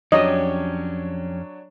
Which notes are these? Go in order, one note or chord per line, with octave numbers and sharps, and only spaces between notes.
F2 F#3 C#4 D4 G4 C#5 D#5